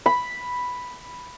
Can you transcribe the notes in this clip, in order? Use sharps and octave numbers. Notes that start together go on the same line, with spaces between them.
B5